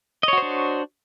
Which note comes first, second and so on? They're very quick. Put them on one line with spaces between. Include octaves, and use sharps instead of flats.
D#5 C#5 F#4 C5 D4